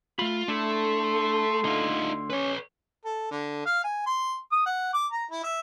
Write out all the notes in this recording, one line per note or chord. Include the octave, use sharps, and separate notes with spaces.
A3 F4 B5
A3 D4 E4 A4 C6
D2 D3 D#4 F4
C#4 B4 C#5
A4
D3
F5
G#5
C6
D#6
F#5
D6
A#5
E4
E5